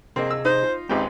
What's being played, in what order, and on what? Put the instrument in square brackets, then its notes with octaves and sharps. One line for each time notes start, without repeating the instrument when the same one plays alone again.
[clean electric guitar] C3 G#4 D#5 [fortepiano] A#3 C4
[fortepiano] E6
[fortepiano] D#4 [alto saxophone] C5
[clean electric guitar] F4
[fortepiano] G#1 C#2 G4 [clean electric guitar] C4 B4 C5 [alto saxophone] D#4